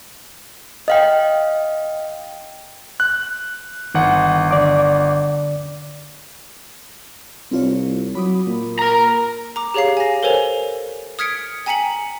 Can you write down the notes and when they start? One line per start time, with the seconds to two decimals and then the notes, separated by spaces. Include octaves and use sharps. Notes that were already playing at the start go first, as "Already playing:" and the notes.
0.88 D#5 F5 G5
3.00 F#6
3.95 G1 D#3 F#5
4.51 D3 D5 D6
7.52 C2 C4 F4 C#5
8.15 F#3 B5 D6 D#6
8.47 A#2
8.79 A#4 A#5
9.56 A#5 D6
9.74 G4 G#4 C#5 F5 C7
9.97 G#5 A#6
10.23 A4 A#4 C5 C#5 G#5 F7
11.19 D#6 F6 G#6 B6 C#7 D7
11.66 G5 G#5 A#5 B6 C#7 F#7